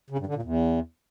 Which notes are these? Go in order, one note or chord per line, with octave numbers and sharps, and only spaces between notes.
C#3
G2
D3
A#2
E2